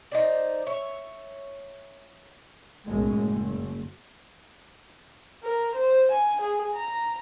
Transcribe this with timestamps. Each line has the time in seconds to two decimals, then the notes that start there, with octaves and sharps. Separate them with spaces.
0.11 D#4 C5 D5
0.66 C#5 E5
2.85 B1 F#2 A2 G#3
3.15 F#1
5.44 A#4
5.75 C5
6.11 G#5
6.41 G#4
6.76 A#5